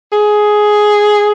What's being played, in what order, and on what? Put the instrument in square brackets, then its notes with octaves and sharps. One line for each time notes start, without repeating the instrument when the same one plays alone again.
[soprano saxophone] G#4